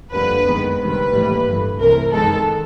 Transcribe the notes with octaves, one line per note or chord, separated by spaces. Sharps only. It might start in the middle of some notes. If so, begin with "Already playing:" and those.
F2 D3 G3 A#3 B4
F#2 D#3 G#3 B3
D2 C3 D#3 G3 B4
A#1 A2 E3 G3 A#3
G1 G2 E3 A3
C2 C3 E3 A3 A#4
F#2 D#3 G#3 B3 A4